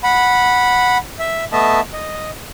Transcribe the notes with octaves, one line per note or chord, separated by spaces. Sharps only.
F#5 B5
E5
A3 B3 D#5 E5 A5
D#5